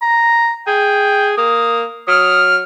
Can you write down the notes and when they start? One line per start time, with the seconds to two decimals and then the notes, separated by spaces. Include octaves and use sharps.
0.02 A#5
0.67 G#4 G5
1.38 A#3 D#6
2.08 F#3 D#6 F6